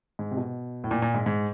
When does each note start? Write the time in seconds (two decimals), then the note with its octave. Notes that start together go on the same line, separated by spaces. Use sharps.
0.19 G#2
0.31 C3
0.37 B2
0.84 A2
0.91 A#2
1.02 A#2
1.14 G#2
1.26 G#2